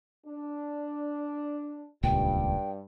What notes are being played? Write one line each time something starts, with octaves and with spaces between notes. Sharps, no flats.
D4
D#1 C#2 G2 A#2 G5